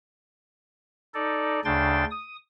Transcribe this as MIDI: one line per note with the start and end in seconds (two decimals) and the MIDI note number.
1.14 1.60 63
1.14 1.60 69
1.14 1.60 74
1.65 2.04 38
1.65 2.04 49
1.65 2.04 62
1.65 2.04 79
1.65 2.04 84
1.65 2.04 93
2.11 2.36 87